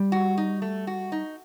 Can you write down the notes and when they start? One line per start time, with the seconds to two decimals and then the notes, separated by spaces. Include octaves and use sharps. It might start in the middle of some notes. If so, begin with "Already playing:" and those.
Already playing: G3
0.12 F#4
0.38 D#4
0.62 A3
0.87 F#4
1.12 D#4